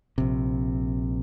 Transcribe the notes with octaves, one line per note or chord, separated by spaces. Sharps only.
A#1 C3